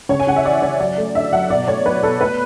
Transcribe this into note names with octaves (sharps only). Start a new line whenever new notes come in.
C#3 C#5
G#5
C#3 F#5
E5
E3 D5
C#3 C#5
F#3 D5
A3
D3 E5
F#3 F#5
B2 D5
A3 C#5
F#3 B4
B2 A4
A3 B4